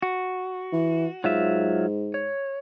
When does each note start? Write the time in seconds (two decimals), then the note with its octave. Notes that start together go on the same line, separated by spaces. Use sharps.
0.02 F#4
0.73 E3
1.24 G#2 F#3 F4 E5
2.14 C#5